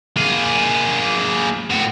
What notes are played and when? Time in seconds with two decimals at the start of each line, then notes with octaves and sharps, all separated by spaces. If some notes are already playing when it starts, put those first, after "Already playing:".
0.16 A#3 G#4
1.70 A2 F#4